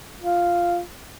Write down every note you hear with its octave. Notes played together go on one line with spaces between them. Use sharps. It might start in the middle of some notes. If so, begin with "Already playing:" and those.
F4